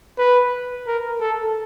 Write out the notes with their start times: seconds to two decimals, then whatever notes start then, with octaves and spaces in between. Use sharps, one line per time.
0.18 B4
0.87 A#4
1.21 A4